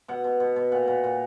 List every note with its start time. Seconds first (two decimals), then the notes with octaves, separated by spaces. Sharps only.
0.08 B2 F#5
0.24 B2
0.40 B2
0.56 B2
0.72 A#2 F#5
0.87 A#2
1.04 A#2